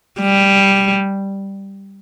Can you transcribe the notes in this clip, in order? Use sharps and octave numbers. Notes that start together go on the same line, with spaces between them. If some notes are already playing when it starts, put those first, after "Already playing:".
G3